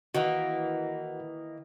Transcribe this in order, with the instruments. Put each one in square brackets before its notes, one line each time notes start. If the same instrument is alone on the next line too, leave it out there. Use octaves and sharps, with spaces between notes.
[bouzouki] D#3 E3 A#3 [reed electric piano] F#4 F#5